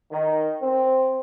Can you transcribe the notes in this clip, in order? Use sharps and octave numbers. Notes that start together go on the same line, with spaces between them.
D#3
C4